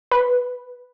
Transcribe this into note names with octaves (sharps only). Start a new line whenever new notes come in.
B4